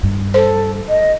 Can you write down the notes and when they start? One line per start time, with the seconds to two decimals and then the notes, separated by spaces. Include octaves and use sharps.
0.03 G2
0.34 A4 C5
0.89 D#5